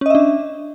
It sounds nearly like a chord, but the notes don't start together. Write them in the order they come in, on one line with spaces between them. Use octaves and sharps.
C#4 D#5 E5 D4